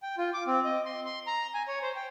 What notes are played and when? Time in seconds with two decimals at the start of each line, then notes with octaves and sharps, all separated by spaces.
0.03 G5
0.18 F4
0.33 D6
0.47 C4
0.65 D#5
0.85 C6
1.06 C6
1.27 A#5
1.54 G#5
1.68 C#5
1.82 C5
1.96 G5